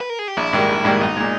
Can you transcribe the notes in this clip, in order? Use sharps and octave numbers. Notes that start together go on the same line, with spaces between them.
B4
A#4
G#4
G4
A#1 E4
G#2 D#3 G3 A#3
A#1
G#2 D#3 G3 A#3
B1 D#4
A#2 G#3